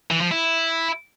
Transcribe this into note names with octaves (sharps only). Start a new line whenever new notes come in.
E3
F3
E4